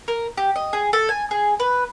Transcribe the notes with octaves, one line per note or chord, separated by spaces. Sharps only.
A#4
G4
D#5
G#4
A4
G#5
G#4
B4